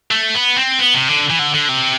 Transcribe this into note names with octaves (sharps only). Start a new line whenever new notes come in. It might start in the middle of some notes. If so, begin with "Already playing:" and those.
A3
B3
C4
B3
C3
D3
E3
D3
D3
C3